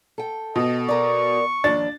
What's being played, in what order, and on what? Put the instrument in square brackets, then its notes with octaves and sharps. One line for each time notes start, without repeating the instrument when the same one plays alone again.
[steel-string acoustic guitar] A4 G5
[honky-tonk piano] B2 [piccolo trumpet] D#5
[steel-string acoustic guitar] A#4 D5 [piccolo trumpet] C#6
[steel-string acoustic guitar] D#2 F3 [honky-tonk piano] D4 A6